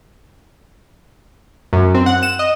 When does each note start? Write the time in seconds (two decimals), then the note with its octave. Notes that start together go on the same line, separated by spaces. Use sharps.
1.73 F#2
1.94 C4
2.06 F#5
2.23 E7
2.39 D#5